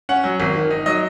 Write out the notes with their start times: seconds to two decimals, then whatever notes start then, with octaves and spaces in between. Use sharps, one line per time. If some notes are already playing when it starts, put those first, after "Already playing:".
0.09 C#4 F#5
0.24 F#3
0.40 G#1
0.55 D#3
0.71 D#4
0.86 F#3 D#5